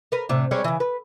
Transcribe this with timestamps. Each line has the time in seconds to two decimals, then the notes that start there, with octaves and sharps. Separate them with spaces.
0.12 A#4 B4
0.29 A2 C3 D4
0.51 G3 G#3 C#5
0.64 C#3 E3
0.80 B4